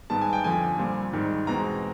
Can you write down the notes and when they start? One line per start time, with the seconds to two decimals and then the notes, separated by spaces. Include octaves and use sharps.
0.10 G#2 D#3 G3 B3 A5
0.21 G#5
0.33 G5
0.44 F2 D3 F3 G#5
0.78 A#2 G3 C4
1.13 G#2 D#3 G3
1.47 E2 B2 G#3 C4 A#5